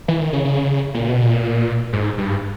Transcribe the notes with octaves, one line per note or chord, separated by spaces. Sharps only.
E3
D#3
C#3
C#3
A#2
B2
A#2
G#2
G2